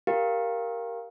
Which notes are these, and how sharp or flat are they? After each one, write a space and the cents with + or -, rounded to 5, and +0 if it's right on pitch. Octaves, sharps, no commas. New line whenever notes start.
G4 +5 A#4 +0 F5 +0